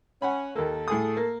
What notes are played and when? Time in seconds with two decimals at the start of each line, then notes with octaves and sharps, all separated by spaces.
0.22 C#4 F#5 G#5 B5
0.55 D#2 A#3 A4
0.88 A2 G#4 D#6
1.17 A#3